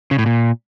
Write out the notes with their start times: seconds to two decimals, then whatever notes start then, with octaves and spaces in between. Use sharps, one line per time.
0.11 C#3
0.19 A2
0.26 A#2